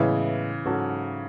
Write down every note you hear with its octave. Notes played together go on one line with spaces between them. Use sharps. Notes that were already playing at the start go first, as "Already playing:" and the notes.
Already playing: A2 C#3 E3 G#3 B3 E4
G#2 F#3 C#4 F#4 A4